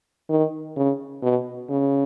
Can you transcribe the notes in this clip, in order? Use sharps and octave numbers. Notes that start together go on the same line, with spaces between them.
D#3
C#3
B2
C#3